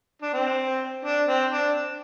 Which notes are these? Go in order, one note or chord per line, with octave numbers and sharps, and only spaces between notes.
D4
C4
D4
C4
D4